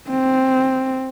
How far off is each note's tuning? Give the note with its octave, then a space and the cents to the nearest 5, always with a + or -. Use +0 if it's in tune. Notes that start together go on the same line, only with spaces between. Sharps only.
C4 +0